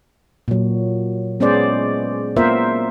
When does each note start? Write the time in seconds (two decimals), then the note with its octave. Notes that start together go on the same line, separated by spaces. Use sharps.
0.48 A#2 F#3
1.40 G#3 B3 C#4 G#4 C5 D5
2.37 A#3 B3 F4 A#4 C5 E5